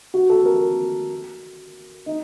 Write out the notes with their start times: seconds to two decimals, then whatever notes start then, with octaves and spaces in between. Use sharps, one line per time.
0.14 F#4
0.30 A4
0.46 A#4
2.06 D#4